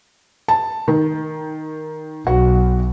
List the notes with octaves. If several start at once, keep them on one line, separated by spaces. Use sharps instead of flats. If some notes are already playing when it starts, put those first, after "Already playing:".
A5
D#3
B1 F#4